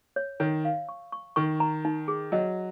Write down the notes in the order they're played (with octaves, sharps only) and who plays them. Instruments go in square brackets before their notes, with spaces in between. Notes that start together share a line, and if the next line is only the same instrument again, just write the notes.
[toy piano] C#5
[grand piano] D#3 [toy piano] C#5
[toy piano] F5
C#6
C#6
[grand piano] D#3 [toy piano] C#6
[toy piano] A#5
D#4
G#4
[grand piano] F#3 [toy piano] D#5